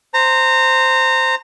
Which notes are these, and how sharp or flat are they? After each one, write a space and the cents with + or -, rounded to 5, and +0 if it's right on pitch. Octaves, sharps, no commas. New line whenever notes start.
C5 -5 A#5 -25